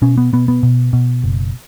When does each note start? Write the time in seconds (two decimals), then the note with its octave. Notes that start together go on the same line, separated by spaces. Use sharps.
0.02 B2 C#4
0.18 B3
0.33 B2 B3
0.48 B3
0.63 B2
0.93 B2
1.24 F#1